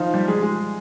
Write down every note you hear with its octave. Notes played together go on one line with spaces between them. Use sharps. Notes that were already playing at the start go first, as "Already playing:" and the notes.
Already playing: D#3 F3 D#4 F4
G3 G4
G#3 G#4
G#3 G#4